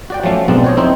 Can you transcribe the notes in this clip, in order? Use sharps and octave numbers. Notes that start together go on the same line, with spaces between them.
F#4 D5 G5
F3 F#3 A3 C#4
B1 G#3 B3 C4 D4 A5
C5 C#5 D#5
F2 C4 D#4 E4 C5